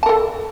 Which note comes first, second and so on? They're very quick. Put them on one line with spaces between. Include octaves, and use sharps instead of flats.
A5 A#4 A4